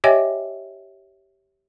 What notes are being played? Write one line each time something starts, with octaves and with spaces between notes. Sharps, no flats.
G4 C#5 D#5 E5 G5 G#5